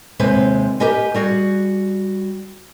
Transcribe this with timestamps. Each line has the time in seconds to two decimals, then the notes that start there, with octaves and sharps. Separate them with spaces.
0.19 D#2 C3 G#3 B4 C5
0.80 G4 A#4 B4 D#5 G#5
1.14 G3 F#4 G#4